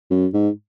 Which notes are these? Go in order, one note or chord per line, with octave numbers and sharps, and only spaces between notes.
F#2
G#2